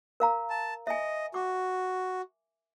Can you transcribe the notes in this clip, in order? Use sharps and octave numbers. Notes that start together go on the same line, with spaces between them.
A#4 F5 A#5
A5
D#5 E5 G#5
F#4 D6